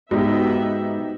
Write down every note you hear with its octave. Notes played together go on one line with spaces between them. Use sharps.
G#2 B3 D#4 F#4 G4 E5